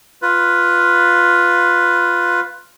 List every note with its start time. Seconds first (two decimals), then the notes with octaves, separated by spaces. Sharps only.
0.22 F4 B4